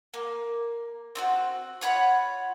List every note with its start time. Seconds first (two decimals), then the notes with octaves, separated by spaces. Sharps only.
0.14 A#3
1.15 C4 D4 F#4
1.81 F4 C#5 F#5 B5